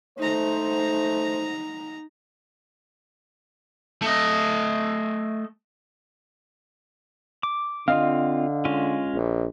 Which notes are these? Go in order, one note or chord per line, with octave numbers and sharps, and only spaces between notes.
A3 D#4 C5 A#5
A3 D#5
D6
D3 C4 F4 D#5 F5
G#3 C#4 F4
A#1